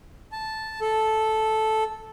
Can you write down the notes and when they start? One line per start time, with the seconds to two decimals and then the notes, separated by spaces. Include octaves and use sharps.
0.32 A5
0.81 A4